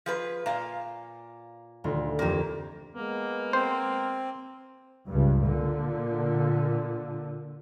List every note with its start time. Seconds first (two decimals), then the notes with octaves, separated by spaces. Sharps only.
0.06 F3 G#4 B4
0.46 A#2 F5 A#5 E7
1.84 D#1 D2 F4
2.19 F2 E3 A#3 C4 G4
2.95 G#3 A#3 B3
3.53 C4 C5
5.09 C#2 G2
5.42 A#2 D3